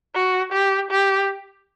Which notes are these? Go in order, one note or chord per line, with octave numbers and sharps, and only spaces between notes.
F#4
G4
G4